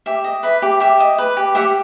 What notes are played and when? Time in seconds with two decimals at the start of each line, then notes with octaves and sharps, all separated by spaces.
0.06 G4 E5
0.24 D#5
0.43 B4 E5
0.62 G4
0.80 G4 E5
1.00 D#5
1.18 B4
1.37 G4
1.55 G4 E5 F#5